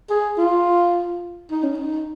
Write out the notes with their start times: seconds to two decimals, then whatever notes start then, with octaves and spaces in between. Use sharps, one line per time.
0.10 G#4
0.38 F4
1.51 D#4
1.63 C#4
1.75 D#4